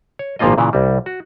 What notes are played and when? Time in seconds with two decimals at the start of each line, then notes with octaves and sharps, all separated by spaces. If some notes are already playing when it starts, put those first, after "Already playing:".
0.19 C#5
0.39 G#1 A#2 F3 A#3 F4 D#5
0.58 A#2 C#3 E3
0.73 C2 G3
1.06 F#4